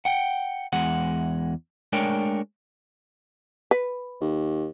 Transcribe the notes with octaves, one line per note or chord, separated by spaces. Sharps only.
F#5 G5
E2 G#3 F#5
G#3 A3 D4 A#4 C#5 G5
B4
D#2